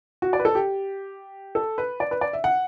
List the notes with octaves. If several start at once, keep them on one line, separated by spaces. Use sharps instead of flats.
F#4
D5
B4
A4
G4
A4
B4
D5
B4
D5
E5
F#5